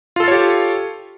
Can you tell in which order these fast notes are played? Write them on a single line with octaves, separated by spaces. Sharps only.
F4 A4 F5 C#5 G4